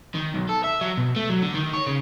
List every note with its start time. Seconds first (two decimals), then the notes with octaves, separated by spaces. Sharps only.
0.15 D#3
0.35 B1
0.49 A4
0.64 E5
0.81 F#3
0.97 B2
1.16 A3
1.30 F#3
1.42 D3
1.54 D#3
1.73 C#5
1.87 C#3